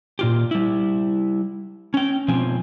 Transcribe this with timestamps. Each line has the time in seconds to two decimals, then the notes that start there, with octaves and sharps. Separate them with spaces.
0.19 A#2 F4 G4
0.51 G3 E4
1.94 C#4 G5
2.28 B2 F3 C4 G#5